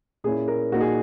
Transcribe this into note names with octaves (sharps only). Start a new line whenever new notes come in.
A#2 A#3 C#4 E4 G#4
A#4
A#2 A#3 D#4 F#4
G#4